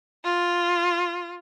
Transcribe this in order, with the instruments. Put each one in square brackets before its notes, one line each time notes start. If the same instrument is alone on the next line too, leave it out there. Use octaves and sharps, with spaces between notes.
[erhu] F4